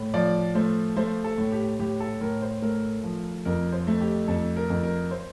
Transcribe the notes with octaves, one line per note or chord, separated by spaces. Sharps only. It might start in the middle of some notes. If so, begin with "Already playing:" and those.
Already playing: A2 A3
F3 D5
A3 C5
A3 C5
A4
A2
G4
A2 G4
A4
A2 A#4
C5
A3 A#4
F3
F2 A#4
C5
A3
G4
F2 A4
A#4
F2
A#4
C5